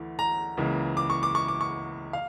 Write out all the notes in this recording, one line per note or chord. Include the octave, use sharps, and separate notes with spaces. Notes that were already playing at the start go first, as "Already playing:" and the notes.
Already playing: D2 E3 A3
A#5
C#2 C#3 E3 A#3
D6
C#6
D6
C#6
D6
C#6
F5